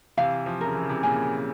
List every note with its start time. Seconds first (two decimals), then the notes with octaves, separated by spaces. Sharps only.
0.17 C3 E3 F5
0.46 F3
0.61 C#3 F3 A#4
0.75 E3
0.82 C#3
0.89 C3 E3
1.03 A#2 C#3 G#5